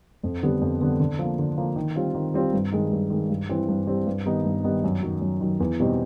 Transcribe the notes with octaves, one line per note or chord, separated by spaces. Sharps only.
F2
D3 G3 B3
F2
D3 G3 B3
D3
F3 A#3
D3
F3 A#3
D#3
G3 C4 F4
D#3
G3 C4 F4
G2
D#3 G#3
G2
D#3 G#3
G2
E3 G3 C4
G2
E3 G3 C4
G2
D#3 G3 B3 D#4
G2
D#3 G3 B3 D#4
F#2
D#3 F#3
F#2
D#3 F#3
E2
B2 G3 C4 D#4